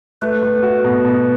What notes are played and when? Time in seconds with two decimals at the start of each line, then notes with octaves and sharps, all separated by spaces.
0.22 A3 B4
0.43 A3
0.63 F#4
0.84 B2
1.05 B2